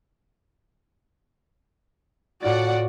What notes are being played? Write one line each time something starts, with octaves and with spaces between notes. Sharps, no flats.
A2 F4 F#4 D5 F#5 A6